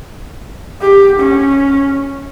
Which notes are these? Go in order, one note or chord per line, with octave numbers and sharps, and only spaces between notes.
G4
C#4